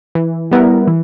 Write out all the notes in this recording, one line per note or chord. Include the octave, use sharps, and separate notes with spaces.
E3
G3 B3 E4 A#4
E3